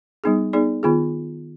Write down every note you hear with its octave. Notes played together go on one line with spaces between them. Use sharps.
G3 B3 D#4 G#4
B3 D#4 G#4 D5
D#3 B3 F4 G#4